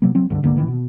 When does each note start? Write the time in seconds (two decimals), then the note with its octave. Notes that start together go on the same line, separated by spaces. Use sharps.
0.02 C3 F#3 A#3
0.15 F#3 C4
0.30 C#2 G2 D3
0.43 C#2 G2 D3 A#3
0.56 A1 D#3 E3
0.68 B2